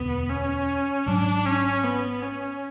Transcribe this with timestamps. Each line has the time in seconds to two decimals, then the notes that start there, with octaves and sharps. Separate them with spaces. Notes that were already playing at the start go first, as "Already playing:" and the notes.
Already playing: E1 D2 B3
0.29 C#4
1.06 G#1 G#2 F#3 D4
1.45 C#4
1.83 B3
2.22 C#4